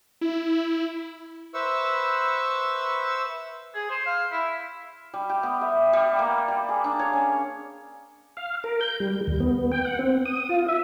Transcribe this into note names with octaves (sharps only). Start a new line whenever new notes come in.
E4
B4 C5 E5 C#6 E6
G#4
C5
F5
E4
G3
G4
B3
E5
G3
A#3
G3
G#4
D4
C#5
C#4
F5
A#4
G6
G3
D#2
B3
G5
F#5
C4
D#6
F4
E5